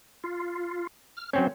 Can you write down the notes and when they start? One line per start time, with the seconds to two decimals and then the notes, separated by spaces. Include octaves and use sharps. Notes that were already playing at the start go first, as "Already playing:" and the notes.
0.24 F4
1.17 F6
1.33 F#3 C4 C#4 C5